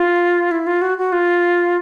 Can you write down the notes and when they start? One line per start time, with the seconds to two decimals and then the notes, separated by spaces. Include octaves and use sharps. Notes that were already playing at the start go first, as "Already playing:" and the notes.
Already playing: F4
0.51 E4
0.67 F4
0.81 F#4
0.98 F#4
1.12 F4